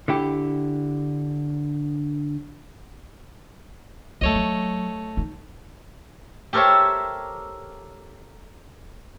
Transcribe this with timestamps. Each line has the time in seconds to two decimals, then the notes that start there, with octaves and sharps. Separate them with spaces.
0.08 D3 E4 G4
4.21 D2 F#3 A3 C#5 D#5
4.35 F#3
5.17 D#4
6.53 G4 A4 A#4 C5 C#5 E5